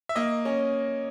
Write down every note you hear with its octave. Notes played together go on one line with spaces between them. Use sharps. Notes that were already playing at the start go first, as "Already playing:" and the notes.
E5
A#3 D#5
C#4